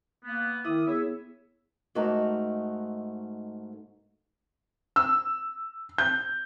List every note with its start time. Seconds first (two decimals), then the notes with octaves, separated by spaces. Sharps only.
0.24 A#3 B3
0.65 D#3 E4 E5 D6 D#6
0.87 B3 G#4 C#5 E5
1.95 G#2 A3 D#4 F#4 A#4 A5
4.96 E6
5.98 G6